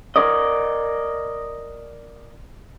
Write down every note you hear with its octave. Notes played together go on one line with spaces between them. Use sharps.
A#4 D5 D#5